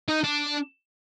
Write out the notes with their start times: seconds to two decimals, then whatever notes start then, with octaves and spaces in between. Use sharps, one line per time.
0.08 D#4
0.24 D4